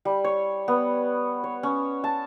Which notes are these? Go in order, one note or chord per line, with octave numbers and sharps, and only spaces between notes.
G3
C#5
B3
C#5
C#4
A5